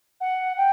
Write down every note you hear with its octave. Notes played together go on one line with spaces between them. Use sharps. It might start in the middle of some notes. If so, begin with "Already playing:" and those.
F#5
G5